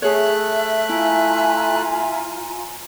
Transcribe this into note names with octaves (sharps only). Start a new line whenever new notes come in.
A3 G#4 C#5 E5 F#6
E4 F4 G#5 A#5